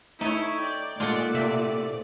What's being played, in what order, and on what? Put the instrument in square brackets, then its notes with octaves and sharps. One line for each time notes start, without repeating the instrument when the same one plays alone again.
[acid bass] A3 [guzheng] D#4 C#5 [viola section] E4
[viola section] D5 G5
[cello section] A#2 [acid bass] G#3 [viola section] A3 D5 [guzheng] F4 A4 F#5
[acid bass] C3 [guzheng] E5